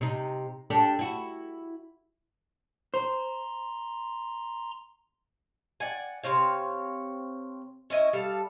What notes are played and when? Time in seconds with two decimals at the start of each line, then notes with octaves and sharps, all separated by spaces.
0.01 C3 D#4
0.70 D4 G4 A4
0.99 E4 F#4
2.94 C5 A#5 C6
5.80 D5 F#5 G#5
6.23 C3 C4 C#5 F5
7.90 C#4 E4 D#5 E5
8.13 G3 A4 F5